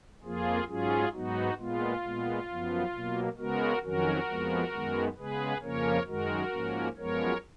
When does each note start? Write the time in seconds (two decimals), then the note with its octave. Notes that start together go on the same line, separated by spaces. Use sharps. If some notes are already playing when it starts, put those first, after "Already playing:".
0.24 F2 F3 A#3 F4 G#4
0.68 G#2 F#3 C#4 F4 G#4
1.13 G#2 F#3 B3 D#4 F#4
1.58 A#2 G#3 B3 F4
2.04 A#2 G#3 B3
2.48 F#2 F3 B3
2.92 B2 F#3 A#3
3.37 C#3 G#3 B3 F#4 A#4
3.83 F2 D#3 F#3 C#4 F#4 A#4
4.28 F2 F3 G#3 B3
4.73 F#2 D#3 G#3 B3
5.17 C#3 G#3 B3 G#4 B4
5.62 F2 C#3 F3 A#3 C#4 A#4 C#5
6.07 F#2 D#3 G#3 F#4 A#4
6.52 G#2 F3 A#3 C#4
6.97 F#2 F3 G#3 B3 A#4 C#5